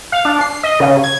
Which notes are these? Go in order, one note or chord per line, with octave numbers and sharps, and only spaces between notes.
F5
D4
C7
D#5
C#3
G#6